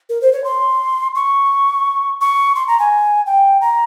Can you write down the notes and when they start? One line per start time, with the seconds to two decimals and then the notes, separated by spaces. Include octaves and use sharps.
0.09 A#4
0.22 C5
0.33 C#5
0.44 C6
1.15 C#6
2.21 C#6
2.56 C6
2.68 A#5
2.79 G#5
3.26 G5
3.61 A#5